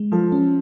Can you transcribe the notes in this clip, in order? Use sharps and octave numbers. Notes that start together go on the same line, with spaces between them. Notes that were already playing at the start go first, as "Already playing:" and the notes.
Already playing: G#3
F3 A4
C#4